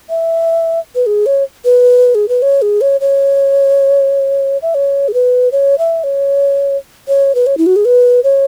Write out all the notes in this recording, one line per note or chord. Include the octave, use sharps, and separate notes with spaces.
E5
B4
G#4
C#5
B4
G#4
B4
C#5
G#4
C#5
C#5
E5
C#5
G#4
B4
C#5
E5
C#5
C#5
B4
C#5
E4
F#4
G#4
B4
C#5